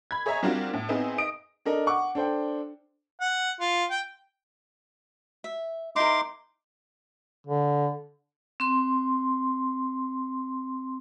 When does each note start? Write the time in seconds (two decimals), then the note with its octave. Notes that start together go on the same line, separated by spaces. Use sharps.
0.11 B5 G#6
0.26 G#4 C#5 D#5 E5 A#5
0.43 G3 C4 D4 F4 F#4 A#4
0.74 A2
0.89 B3 C4 D#4 E4 G#4
1.18 D#5 D#6 D7
1.65 D4 A4 A#4 D#5
1.86 F#5 C#6 D6
2.15 D4 A4 C5 G5
3.21 F#5
3.61 F4
3.91 G5
5.44 E5
5.96 D#4 E4 A#4 C6 D6
7.47 D3
8.60 C4 C6